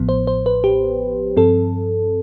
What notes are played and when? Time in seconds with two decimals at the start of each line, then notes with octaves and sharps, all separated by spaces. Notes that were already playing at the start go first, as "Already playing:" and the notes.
Already playing: A1 A2 F3 B3
0.09 C5
0.27 C5
0.46 B4
0.64 G4
1.36 G2 F3 C4 A4